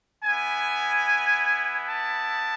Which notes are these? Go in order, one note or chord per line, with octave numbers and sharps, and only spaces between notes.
B3 E4 G#5
A5